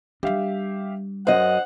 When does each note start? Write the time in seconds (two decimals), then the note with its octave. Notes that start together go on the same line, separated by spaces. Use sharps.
0.23 G3 D4 G4 E5 F5
1.27 F#2 C5 D#5 F#5